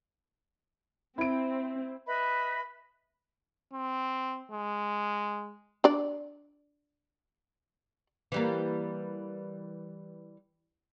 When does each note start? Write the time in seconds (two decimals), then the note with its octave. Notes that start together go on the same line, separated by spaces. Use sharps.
1.18 C4 E4 D7
2.06 B4 D#5 E5 B5
3.73 C4
4.52 G#3
5.84 D4 D5
8.32 E3 G3 A#3